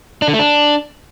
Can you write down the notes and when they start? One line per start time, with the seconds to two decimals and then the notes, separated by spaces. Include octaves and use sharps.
0.22 D4
0.28 D3
0.34 A3
0.39 D4